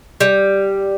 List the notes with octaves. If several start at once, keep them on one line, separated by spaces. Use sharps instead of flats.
G3